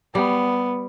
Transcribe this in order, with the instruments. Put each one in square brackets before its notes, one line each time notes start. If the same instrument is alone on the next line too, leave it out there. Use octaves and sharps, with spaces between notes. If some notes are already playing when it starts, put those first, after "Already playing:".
[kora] G3 [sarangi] B3